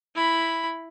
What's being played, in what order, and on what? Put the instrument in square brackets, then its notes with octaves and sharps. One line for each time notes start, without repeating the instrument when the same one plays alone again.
[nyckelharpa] E4 B5